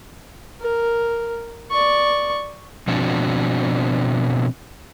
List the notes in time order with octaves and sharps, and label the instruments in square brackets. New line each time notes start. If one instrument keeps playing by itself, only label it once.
[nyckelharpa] A#4
D5 C#6
[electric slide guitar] B2 F3 C4 D4 F#4